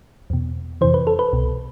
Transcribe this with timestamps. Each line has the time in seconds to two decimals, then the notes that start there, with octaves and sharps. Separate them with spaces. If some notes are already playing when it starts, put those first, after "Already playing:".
0.30 E2 B2
0.81 F2 C3 E3 C5
0.94 B4
1.07 A4
1.19 B4
1.33 C2 B2